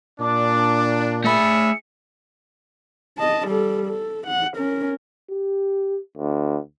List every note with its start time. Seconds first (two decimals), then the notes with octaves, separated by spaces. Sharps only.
0.20 A#2 D4 D6
1.24 A3 D4 G#4 E5 B5 C#7
3.18 D#5 A5
3.48 G3 A4
3.87 A4
4.27 F#5
4.57 C#4 A#4
5.31 G4
6.18 D2